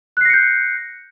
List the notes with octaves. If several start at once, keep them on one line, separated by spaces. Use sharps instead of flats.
F#6 G6 A#6 C7 C#7